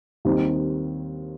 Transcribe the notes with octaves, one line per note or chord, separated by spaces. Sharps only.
D#2 D#3 G3 C4 D#4